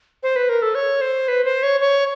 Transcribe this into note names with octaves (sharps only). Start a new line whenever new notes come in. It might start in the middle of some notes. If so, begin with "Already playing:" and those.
C5
B4
A#4
A4
C#5
C5
B4
C5
C#5
C#5